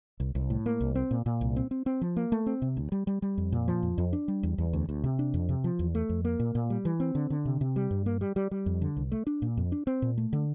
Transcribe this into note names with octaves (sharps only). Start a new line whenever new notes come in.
C2
C2
A2
A#3
C2
C4
A#2
A#2
C2
C4
C4
C4
F3
A#3
A3
C4
C3
D2
G3
G3
G3
F2
A#2
F3
F2
F2
D4
G3
E2
E2
D2
D2
C3
D4
F2
C3
F3
E2
A3
F2
A#3
A#2
A#2
G3
E3
C4
D3
D3
C3
C3
G3
G2
A#3
G3
G3
G3
F2
D3
C2
A3
D4
A#2
F2
D4
C4
A#2
A3
D3